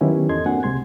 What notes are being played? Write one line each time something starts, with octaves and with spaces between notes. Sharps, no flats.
D#3 F#3 B3 C#4 E4 G4
E2 A4 D#5 C6 G#6
A#3 C4 D4 F#4 F#5 G#5
C2 C3 G#3 C6 G#6